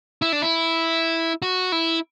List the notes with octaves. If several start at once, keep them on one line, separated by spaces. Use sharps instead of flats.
E4
D4
E4
F#4
E4